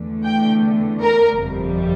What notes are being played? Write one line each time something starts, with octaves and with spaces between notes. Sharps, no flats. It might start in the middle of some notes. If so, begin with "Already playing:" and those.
Already playing: E2 D3 A3
G5
A#4
G1 F2 C3 G3